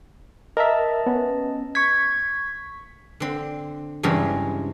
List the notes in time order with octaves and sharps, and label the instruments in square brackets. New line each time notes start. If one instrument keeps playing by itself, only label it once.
[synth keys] A#4 E5 [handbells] D#5 A5
[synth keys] B3 C#4
[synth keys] C#6 B6 [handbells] G#6
[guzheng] D3 C4
E2 G2 C#3 G#3 C4